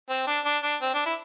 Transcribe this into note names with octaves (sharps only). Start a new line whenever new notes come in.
C4
D4
D4
D4
C4
D4
E4